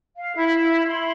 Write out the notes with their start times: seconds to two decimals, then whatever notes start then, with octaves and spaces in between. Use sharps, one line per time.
0.16 F5
0.35 E4
0.87 B5 C6